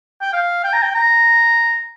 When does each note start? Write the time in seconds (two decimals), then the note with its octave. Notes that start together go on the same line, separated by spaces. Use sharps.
0.21 G5
0.33 F5
0.64 G5
0.73 A#5
0.82 G5
0.95 A#5